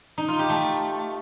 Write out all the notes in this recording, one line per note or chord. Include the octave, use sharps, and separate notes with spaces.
D#4
F4
G4
A3